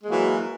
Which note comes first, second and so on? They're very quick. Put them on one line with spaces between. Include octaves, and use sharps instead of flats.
G#3 A#3 F#3 E3